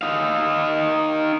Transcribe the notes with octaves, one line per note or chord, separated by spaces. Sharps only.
D#4 F5